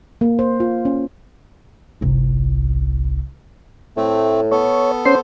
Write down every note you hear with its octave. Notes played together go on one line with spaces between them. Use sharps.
A#3
C5
F4
C#4
G1 C2
A2 A3 C4
B3 A4 C#5
C#4 C5 C6